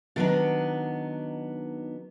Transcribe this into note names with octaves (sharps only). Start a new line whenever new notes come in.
D3 D#3 F#3 B3 D4 D#4